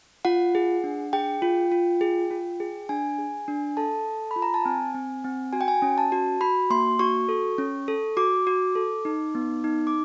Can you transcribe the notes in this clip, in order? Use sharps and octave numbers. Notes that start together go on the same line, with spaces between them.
F4 F#5
G#4
D4
G#4 G5
F4
F4
G#4
F4
G#4
D4 G#5
G#4
D4
A4 A5
A4
F4 B5
A#5
A5
C4 G#5
C4
C4
F#4 G#5
G5
G#5
C#4
A5
F#4
F#4 B5
A#3 C6
F#4 C#6
A4
C#4
A4
F#4 D6
F#4
A4
D#4
B3
D#4
D6